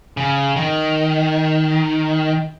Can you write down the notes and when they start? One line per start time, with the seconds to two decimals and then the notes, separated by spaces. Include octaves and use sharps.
0.17 C#3
0.56 D#3